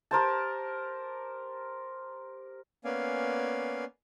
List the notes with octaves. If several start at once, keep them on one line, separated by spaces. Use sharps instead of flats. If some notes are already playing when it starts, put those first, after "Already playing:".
G4 A#4 C5 A5
A#3 B3 C#4 D5 F5 G#5